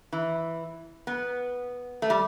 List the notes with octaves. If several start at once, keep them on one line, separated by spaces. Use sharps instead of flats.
E3
B3
A3
G3